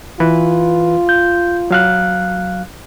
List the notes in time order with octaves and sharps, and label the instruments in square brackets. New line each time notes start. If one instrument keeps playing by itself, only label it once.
[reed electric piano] E3 B4 [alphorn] F4
[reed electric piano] G6
F#3 F5 F#6